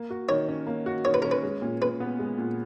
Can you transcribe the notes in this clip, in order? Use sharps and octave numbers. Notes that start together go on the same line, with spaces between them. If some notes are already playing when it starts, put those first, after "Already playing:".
Already playing: A#3
F#4
D#3 C#5
C#4
A#3
F#4
D#3 C#5
B4
C#4 A#4
B4
G#3
A#2
A#2 B4
B3
G#3
A#2